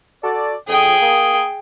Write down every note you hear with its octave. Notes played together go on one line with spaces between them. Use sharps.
F#4 A4 D5
F2 G#4 G5 D#6
A#3 D#6